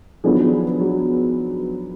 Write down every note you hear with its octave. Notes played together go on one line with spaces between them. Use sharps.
D#3 F3 F#3 B3 D4 G#4
F#3